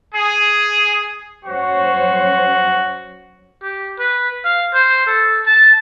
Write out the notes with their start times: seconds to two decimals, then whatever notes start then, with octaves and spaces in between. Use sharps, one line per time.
0.14 G#4
1.45 F#2 F#4 C5 C#5
3.63 G4
3.99 B4
4.45 F5
4.73 C5
5.07 A4
5.46 A5